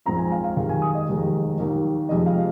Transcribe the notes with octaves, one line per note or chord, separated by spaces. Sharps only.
A#1 G#2 G#3 C4 F4 A#5
G#5
F5
F5
D#2 D#3 G#3 F5
G#5
D#6
D#5
F1 D#2 D#3 G#3
D#2 D#3 A#3 D#4
F1 F2 C3 G#3 D#5
F5